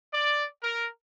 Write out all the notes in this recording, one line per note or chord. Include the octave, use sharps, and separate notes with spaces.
D5
A#4